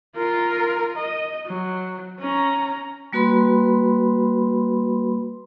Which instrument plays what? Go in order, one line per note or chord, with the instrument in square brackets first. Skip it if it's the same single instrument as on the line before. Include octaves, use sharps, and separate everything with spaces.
[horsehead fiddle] F4 A#4
D#5
F#3
C#4 A#5
[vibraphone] G3 A#3 F#4 B4 B5 C6